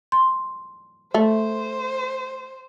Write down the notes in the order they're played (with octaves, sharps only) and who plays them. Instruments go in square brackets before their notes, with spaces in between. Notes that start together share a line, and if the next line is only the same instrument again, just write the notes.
[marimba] C6
[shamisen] A3 [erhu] C5